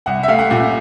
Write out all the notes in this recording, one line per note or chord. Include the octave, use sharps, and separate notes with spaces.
C2 F#5
E5
A3 F5
F#5
A#2 F#5